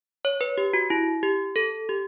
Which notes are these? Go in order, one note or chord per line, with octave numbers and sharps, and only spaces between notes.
C#5
B4
G4
F#4
E4
G4
A4
G4